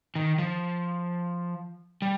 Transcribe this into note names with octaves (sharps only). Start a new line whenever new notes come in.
D#3
F3
G3